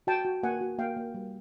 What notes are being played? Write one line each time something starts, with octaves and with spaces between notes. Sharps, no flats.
F#4 G5 A5
F#4
A#3 F#5 G#5
F#4
A#3 F5 G5
A#3
G3